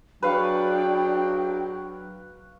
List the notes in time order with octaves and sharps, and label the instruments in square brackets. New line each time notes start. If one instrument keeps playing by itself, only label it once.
[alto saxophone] F#3 [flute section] D4 G#4 G5 [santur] B4 F5 C#6